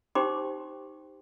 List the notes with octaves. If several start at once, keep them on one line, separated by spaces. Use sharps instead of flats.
D#4 G4 C5 G5 C6 D6